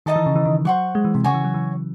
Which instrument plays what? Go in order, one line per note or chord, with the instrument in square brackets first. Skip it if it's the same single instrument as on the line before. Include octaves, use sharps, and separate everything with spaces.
[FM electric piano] D#3 [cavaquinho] D#4 A4 D#5 A5
[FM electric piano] E3
C#3
E3
D#3
[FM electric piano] F#3 [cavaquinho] C5 F#5 C#6
[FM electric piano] G#3
E3
C3
[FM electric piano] C#3 [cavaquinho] F#4 C#5 G#5 C#6
[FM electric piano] E3
F#3
E3